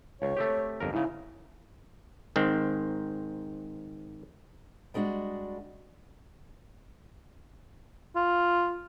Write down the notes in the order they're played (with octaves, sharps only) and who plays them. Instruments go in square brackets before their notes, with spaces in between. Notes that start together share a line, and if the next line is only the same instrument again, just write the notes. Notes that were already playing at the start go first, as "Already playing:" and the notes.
[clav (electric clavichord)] C#2 [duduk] C#5
[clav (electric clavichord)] A3 C4 G4
G1 F2 A#4
[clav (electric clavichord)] G#2 C#3 [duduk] E4
[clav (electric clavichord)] G#2 D#3 C4
[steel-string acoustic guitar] G3 G#3 D4 F4 F#4
[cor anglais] F4